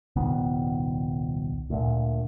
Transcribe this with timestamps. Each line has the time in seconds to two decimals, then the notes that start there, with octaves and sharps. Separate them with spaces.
0.16 D#1 C2 D#3 B3
1.70 D2 A#2